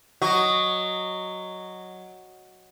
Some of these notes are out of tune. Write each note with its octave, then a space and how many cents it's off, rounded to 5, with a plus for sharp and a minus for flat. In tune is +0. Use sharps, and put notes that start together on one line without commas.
F#3 +0 F#4 +0 D#5 +0